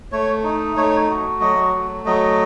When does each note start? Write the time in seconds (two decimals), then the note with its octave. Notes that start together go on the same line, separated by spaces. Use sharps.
0.12 A3 C#5
0.44 D#4
0.77 A3 C#5
1.09 F#4
1.41 F#3 D#5
1.74 A3
2.06 F#3 D#5